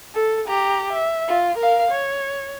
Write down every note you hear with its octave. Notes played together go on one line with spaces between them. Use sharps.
A4
G4 A#5
E5
F4
A#4 F5
C#5